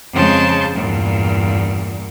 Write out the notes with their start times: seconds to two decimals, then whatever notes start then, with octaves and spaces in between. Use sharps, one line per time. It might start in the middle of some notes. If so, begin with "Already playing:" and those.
0.13 F2 C#3 G#3 A5 C6 G6
0.75 E2 G2 A#2